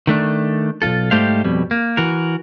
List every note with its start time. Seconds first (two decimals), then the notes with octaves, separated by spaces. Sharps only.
0.07 D#3 A3 D4
0.82 B1 G#2 F4 A4
1.11 G#2 G3 A3 G4 C5 F5
1.44 F2 B2 G3
1.71 A#3
1.97 E3 F#4 A#4